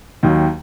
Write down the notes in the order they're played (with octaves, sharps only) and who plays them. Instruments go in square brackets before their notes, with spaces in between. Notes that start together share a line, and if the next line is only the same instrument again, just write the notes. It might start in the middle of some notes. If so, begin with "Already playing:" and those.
[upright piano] D#2 D#3 F#3